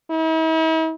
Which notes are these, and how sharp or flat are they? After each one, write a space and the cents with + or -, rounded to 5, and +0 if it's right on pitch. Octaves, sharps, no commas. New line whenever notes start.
E4 -45